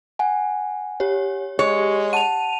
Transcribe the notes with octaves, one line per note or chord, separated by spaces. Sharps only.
F#5 G#5
G4 C#5
G#3 G4 C#5
F#5 A5 D#7 F7